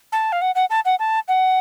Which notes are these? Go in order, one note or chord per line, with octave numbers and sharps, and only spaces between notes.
A5
F5
F#5
F#5
A5
F#5
A5
F#5